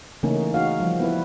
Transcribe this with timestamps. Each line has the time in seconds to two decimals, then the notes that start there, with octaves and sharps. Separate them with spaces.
0.23 C#3 E3 A3 A#3 C#4 D#4
0.54 D#4 F#4 F5
0.80 F3 G3
1.00 B3 E4 B4